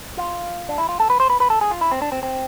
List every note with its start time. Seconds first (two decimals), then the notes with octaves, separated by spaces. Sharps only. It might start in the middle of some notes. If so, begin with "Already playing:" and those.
0.17 F4
0.69 D4
0.78 E4
0.89 F4
1.00 A4
1.10 B4
1.20 C5
1.30 B4
1.40 B4
1.50 A4
1.61 G#4
1.71 F4
1.81 E4
1.91 C4
2.02 D4
2.12 C4
2.23 C4